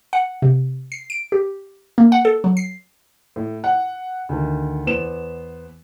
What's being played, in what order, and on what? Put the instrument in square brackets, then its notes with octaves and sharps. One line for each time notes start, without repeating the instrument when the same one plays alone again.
[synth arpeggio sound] F#5
C3
C7
D7
G4
A#3
F#5
A4
F#3
C7
[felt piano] A2
F#5
D2 D#3
E2 B3 C5 E7